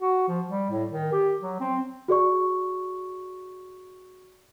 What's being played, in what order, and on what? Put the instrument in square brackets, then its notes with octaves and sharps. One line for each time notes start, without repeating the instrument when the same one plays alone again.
[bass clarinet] F#4
F3
G3
A2
D#3
G4
F#3
C4
[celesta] F#4 G#4 D5 C#6